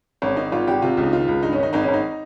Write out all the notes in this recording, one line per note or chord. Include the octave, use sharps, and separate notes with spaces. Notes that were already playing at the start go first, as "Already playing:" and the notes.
G#1 C#4
D#3 D#4
G#1 F4
G#1 G4
C3 F4
C#2
D#4
D#3 F4
C#2
G2 D#4
C#4
D#3 D#4
G#1 D#4
C#4
G#1
D#4